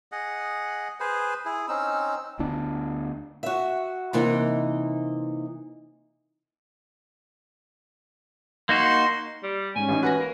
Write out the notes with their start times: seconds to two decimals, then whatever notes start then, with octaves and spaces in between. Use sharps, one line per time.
0.12 G#4 D#5 F#5
1.00 G#4 B4 C5
1.45 E4 G#4
1.68 C4 C#4 D#4 E6
2.39 D2 D3 B3 D4
3.43 F#4 E5
4.13 C3 E3 A#3 D#4
8.69 A#3 D#4 F#4 C6
9.43 G3
9.76 G#2 C#4 G#5
9.89 A1 D#4
10.03 F#4 B4 G#5 A#6
10.19 A#3